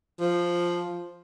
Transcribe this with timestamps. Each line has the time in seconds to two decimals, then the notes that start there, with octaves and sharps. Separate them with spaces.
0.20 F3